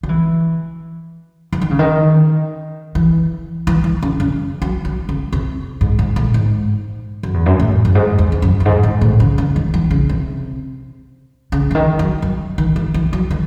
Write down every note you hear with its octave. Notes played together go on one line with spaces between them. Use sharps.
F#3
E3
E3
D#3
C#3
D#3
E3
E3
D#3
C#3
C#3
F#3
F#3
C#3
C3
G#2
G#2
A2
G#2
F#2
E2
F#2
A2
F#2
G#2
E2
E2
F#2
F#2
G#2
G#2
A2
C#3
C#3
D#3
E3
C#3
C3
C#3
C#3
D#3
F#3
F#3
D#3
E3
E3
F#3
D#3